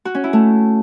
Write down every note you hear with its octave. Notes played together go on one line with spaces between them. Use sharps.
F#4
C#4
E4
A3